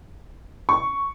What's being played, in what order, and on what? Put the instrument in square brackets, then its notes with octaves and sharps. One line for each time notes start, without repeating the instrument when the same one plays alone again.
[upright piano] C#6